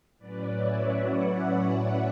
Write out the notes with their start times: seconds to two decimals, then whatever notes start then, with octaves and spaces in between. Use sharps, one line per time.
0.18 A2 F#3 C#4 B4 D5
0.54 C#5 E5
0.90 D5 F#5